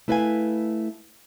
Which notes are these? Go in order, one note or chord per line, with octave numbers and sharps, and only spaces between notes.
A3 E4 B4 D5 F5 G#5